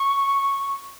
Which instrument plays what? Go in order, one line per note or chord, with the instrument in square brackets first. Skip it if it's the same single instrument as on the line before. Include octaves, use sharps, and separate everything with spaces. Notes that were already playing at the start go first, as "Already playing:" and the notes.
Already playing: [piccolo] C#6